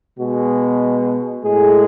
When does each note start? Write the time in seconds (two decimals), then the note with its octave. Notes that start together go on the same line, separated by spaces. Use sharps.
0.17 B2 G#3 F#4
1.43 A2 G#3 G#4